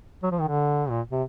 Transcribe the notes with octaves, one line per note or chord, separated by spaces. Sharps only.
F#3
F3
D#3
D3
A#2
C3